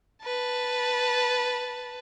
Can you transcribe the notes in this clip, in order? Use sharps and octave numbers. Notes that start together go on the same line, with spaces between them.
B4 A5